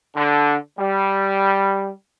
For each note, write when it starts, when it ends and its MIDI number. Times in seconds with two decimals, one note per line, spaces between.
0.16 0.54 50
0.78 1.90 55